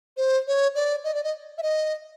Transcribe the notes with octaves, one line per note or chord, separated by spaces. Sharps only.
C5
C#5
D5
D#5
D5
D#5
E5
D#5